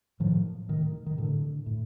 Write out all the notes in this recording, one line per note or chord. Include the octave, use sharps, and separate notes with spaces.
A2 D#3 F3
A2 D#3
D#3
A2 D3
A2